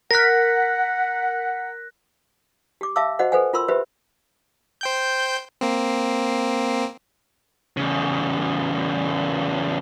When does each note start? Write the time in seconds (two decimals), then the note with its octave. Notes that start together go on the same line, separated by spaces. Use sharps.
0.11 A#4 F#5 F#6 A#6 B6
2.81 G4 D6
2.96 E5 F5 A5 D6 E6
3.19 F#4 C5 D#5 F#5
3.32 A4 B4 C5 F#5 G#5
3.53 F4 A#4 B5 C6 E6
3.68 G4 B4 C5 E5 B5
4.81 C5 G5 G6
5.61 A#3 C4
7.77 E2 C#3